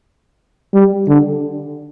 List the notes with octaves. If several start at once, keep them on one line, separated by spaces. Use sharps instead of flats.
G3
D3